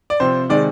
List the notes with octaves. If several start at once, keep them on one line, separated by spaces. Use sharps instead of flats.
D5
C3 F3 C4 C5
C3 D#3 G#3 D5